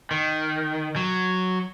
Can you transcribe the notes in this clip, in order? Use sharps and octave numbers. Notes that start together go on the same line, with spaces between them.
D#3
F#3